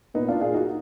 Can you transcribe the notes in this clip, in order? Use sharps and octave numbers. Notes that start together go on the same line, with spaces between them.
A#2 B3 D#4
D4 F4
A#2 F4 G#4
D#4 F#4